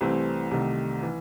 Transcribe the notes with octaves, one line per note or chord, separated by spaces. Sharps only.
C2 C3 E3 A3 C4
C2 C3 D#3 A3
E3